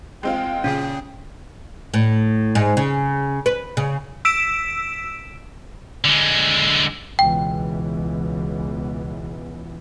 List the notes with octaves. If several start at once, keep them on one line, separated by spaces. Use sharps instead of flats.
G#3 C4 F4 G5
A#2 C#3 C#4 G#4
A2
G#2
C#3
B4
C#3
E6 B6 D7 E7
D3 G#3
C#2 B2 E3 G5